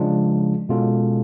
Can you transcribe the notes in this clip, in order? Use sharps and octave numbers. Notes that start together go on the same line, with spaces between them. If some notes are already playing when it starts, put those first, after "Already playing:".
Already playing: C#3 F3 G#3 D4 F4
B2 G#3 C#4 F4 A4